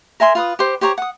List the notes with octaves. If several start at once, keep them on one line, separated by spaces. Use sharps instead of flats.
A#4 E5 G#5 C6
F4 B4 D#6
G4 C5
G4 C5 C#5 A#5
F#5 D#6